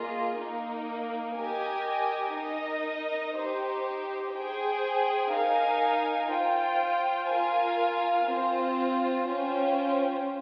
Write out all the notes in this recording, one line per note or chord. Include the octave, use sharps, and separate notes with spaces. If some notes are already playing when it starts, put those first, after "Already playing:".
Already playing: A#3 F4 G#4 D#5
A#3 D#4 A#4
G4 A#4 D#5 G#5
D#4 A#4 D#5
D#4 G4 C5
G#4 C5 G5
D#4 A#4 F5 G#5
F4 C5 G5
F4 A#4 F5 G#5
C4 F4 C5
C#4 F4 C5 G5